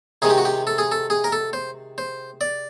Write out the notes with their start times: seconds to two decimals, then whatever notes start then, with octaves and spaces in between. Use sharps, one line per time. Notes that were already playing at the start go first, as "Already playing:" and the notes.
0.22 C3 D#3 G#3 G#4
0.30 G4
0.38 F#4
0.45 G4
0.67 A4
0.78 G#4
0.92 A4
1.10 G#4
1.24 A#4
1.32 A4
1.53 C5
1.98 C5
2.41 D5